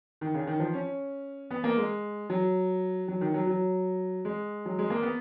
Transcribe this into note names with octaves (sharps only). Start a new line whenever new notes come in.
D#3
C#3
D#3
F3
C#4
B3
A#3
G#3
F#3
F#3
D#3
F#3
F#3
G#3
F#3
G#3
A#3
B3